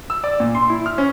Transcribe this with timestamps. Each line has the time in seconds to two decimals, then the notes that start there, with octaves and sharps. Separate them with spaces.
0.10 E6
0.24 D5
0.40 A#2
0.55 C6
0.70 E4
0.86 F6
0.98 C#4